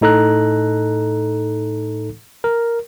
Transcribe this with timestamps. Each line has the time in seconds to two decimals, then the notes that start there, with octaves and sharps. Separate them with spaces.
0.01 A2 D#4 A4 A#5 F#6
2.44 A#4